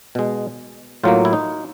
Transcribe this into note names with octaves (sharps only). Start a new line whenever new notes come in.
B2 G#3
A2 F#3 A#3 F4
E4
D#4